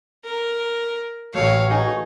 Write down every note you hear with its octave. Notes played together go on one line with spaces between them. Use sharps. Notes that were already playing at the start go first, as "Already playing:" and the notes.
A#4
A1 A3 F#4 C#5 F5
D#4 G#4 G#5